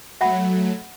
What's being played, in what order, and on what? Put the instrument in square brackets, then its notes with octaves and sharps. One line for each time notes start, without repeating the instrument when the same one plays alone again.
[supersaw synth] F#3 A3 [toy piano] E5 F#5 B5